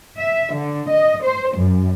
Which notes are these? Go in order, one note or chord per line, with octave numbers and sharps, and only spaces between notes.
E5
D3
D#5
C5
F#2